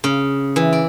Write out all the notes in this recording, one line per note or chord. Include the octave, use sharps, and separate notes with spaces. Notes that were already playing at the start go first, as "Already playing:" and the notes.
C#3
E3
D5